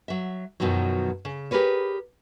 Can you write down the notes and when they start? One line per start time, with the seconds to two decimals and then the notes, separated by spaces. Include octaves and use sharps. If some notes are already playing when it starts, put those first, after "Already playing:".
0.08 F#3 E5
0.60 F#2 B2 D#3 F3 F#3
1.25 C#3
1.51 G4 G#4 A#4 B4 C#5